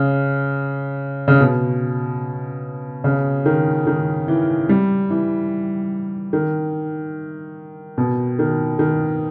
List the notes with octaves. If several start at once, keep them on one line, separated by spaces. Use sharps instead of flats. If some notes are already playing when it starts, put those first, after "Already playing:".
Already playing: C#3
C#3
B2
C#3
D#3
D#3
E3
G3
E3
D#3
B2
D#3
D#3